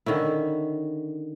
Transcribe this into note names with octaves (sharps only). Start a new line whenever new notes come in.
D3 D#3 C#4 E4